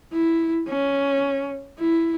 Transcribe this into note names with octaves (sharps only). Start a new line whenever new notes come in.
E4
C#4
E4